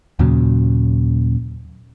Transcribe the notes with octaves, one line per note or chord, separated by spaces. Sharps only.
D#2 A#2 C#3 F#3